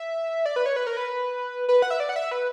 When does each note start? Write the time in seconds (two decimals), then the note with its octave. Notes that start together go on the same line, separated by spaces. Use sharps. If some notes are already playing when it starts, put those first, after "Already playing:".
Already playing: E5
0.46 D5
0.56 B4
0.66 C#5
0.76 B4
0.87 A#4
0.97 B4
1.68 B4
1.82 F#5
1.91 E5
2.00 D5
2.09 F#5
2.16 E5
2.31 B4